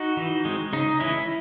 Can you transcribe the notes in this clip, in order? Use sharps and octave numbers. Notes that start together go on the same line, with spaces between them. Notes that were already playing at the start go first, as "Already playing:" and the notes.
Already playing: D#4 F#4
E3
G#3 C4
C#3 D#4
E3 G#3 C#4 E4